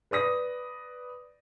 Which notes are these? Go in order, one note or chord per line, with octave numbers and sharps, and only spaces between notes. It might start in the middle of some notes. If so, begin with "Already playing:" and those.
B4 D5 D#6 A#6